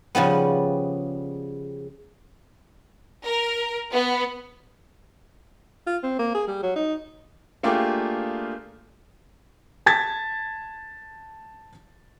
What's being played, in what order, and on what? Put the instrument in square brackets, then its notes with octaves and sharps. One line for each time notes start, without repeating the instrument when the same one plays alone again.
[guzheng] C#3 F3 G3 B3
[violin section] A#4
B3
[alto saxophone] F4
C4
A#3
G#4
G3
F#3
D#4
[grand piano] A3 A#3 D4 F4 G4 G#4
[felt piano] A5 G#6 A6 B6